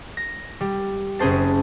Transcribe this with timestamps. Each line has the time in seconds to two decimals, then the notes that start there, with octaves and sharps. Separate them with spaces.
0.17 A#6
0.61 G3
1.19 F#1 C#4 G#4 C5 A5